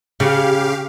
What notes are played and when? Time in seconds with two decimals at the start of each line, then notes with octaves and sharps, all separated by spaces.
0.20 C#3 G4 F5